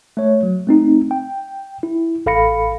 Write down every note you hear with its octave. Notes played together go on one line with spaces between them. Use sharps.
A3 C#5
F#3
A3 C4 D#4
G5
E4
A1 A4 F5 B5 A#6 C#7